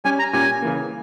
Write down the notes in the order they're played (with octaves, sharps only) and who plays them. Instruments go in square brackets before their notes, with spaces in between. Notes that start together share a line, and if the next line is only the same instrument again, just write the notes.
[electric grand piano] G3 C#4 G4 [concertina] G#5
[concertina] A#5
[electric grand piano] A#2 G3 C#4 G4 [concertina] G#5
[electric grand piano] C#3 E3 A#3